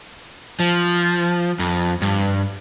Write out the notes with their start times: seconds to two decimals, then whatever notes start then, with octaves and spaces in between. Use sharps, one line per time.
0.60 F3
1.59 F2
2.02 G2